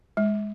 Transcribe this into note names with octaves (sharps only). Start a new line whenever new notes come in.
G#3